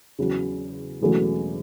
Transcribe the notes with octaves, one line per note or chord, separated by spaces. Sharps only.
E2 C#3 F#3
E1 E2 C#3 F#3 A3